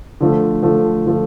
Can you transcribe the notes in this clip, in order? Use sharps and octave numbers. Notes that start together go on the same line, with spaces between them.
D3 F3 A3
D3 F3 A3
D3 F3 A3